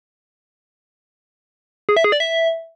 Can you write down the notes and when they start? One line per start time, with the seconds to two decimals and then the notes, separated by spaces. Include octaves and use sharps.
1.89 G#4
1.97 E5
2.04 G#4
2.12 D5
2.20 E5